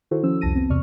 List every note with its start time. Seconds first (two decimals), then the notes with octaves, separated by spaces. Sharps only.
0.11 D#3 E4 F#4 A4 C5
0.23 F3 C#4 C5 E6
0.41 C2 F2 A5 A#6 D#7
0.55 B3 C4
0.70 E2 C3 D5 C#6 F6